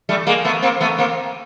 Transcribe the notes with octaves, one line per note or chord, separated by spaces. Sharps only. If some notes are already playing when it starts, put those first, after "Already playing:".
G3 A3
G#3 A#3
A3 B3
A#3 C4
A3 B3
A#3 C4